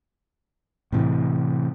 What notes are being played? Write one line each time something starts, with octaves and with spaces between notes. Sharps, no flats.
A2 C3 E3